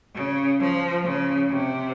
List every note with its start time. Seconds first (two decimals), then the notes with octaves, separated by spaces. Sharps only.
0.15 C#3
0.60 F3
1.04 C#3
1.49 C3